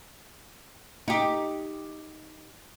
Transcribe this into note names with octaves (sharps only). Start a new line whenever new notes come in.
D#4 G4